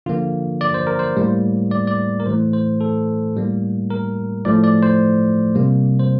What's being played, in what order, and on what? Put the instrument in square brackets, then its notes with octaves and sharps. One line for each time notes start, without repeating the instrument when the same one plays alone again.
[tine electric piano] D3 F3 A#3 F4
D5
C5
A#4
C5
A2 G3 A#3
D5
D5
A#4
A2 E3 A3 C5
C5
A4
A2 G3 A#3
A#4
A2 F3 A3 D5
D5
C5
C3 G3 A#3
C5